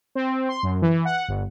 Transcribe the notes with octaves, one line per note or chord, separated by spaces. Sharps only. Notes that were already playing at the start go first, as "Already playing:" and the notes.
C4
C6
F#2
E3
F#5
G1